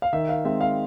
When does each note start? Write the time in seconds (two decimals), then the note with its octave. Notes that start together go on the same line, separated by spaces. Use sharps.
0.02 F5
0.13 D#3 E5
0.29 F5
0.45 G#3 C4 E5
0.61 F5